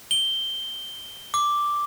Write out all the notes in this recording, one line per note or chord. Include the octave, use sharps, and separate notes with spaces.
G7
D6